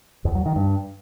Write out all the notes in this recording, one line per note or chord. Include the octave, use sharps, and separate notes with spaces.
E2
F#3
D#3
G2